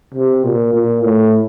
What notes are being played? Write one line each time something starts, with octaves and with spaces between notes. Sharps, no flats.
C3
A#2
A#2
A2